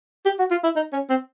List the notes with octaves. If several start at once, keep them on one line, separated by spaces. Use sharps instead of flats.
G4
F#4
F4
E4
D#4
C#4
C4